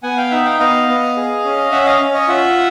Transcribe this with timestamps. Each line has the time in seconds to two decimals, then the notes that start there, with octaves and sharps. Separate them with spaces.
0.03 B3 F#5 G#5
0.17 F5 G5
0.31 D#4 E5 F#5
0.45 F5 G5
0.59 B3 D#5 F5
0.88 B3
1.17 G#4
1.45 C#4
1.72 C#4 E5 F#5
1.86 D#5 F5
2.01 C#4
2.14 C#5 D#5
2.28 F4 E5 F#5